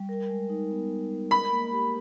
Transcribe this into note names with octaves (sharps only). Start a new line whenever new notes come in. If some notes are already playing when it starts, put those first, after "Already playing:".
Already playing: G3
A#4
G#3
D#4
B3
A#4
G#3
A#4 B5
A#3
G4